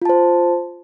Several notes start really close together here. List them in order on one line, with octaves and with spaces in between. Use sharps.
F4 A5 C5